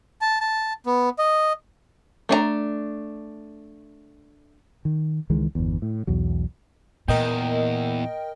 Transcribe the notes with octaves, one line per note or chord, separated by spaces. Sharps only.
A5
A5
B3
D#5
A3 D4 D5 A#5
D#3
C#2 D#3 E3 G#3
G1 E2
A2
B1 E2 F#3
E2 A#2 A#4 D#5 G5